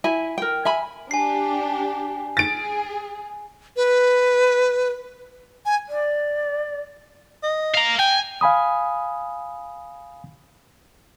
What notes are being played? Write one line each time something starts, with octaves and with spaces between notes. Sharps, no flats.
E4 G#5
A#4 G5
E5 G#5 B5
D4 G4 G#5 C7
G#4 A6 D7
B4
G#5
D5
D#5
F5 A#5
G5 G#5
F5 G#5 B5 D#6